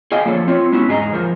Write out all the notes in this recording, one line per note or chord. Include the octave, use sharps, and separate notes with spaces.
G#4 D#5 F5 G5 G#5
F3 A#3 D4 A4 C#5
C4 F4 C#5
G#3 B3 C#4 E4 F#4
E2 G#2 G#3 G#4 D#5 A#5
F2 F3 A#4 C5